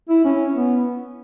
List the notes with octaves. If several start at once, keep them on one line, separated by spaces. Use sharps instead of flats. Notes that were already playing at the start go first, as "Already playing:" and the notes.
E4
C#4
B3